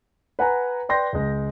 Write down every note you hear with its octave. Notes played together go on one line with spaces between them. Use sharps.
B4 F#5 G#5 A#5
B4 D5 G5 C6 G6 A#6
C#2 G#3